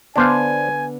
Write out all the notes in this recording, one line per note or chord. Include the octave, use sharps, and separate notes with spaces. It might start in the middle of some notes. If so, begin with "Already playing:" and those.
D3 B3 D4 C5 F5 G#5